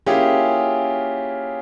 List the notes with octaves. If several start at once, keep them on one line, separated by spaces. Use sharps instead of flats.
A#3 C#4 E4 F4 G4 G#4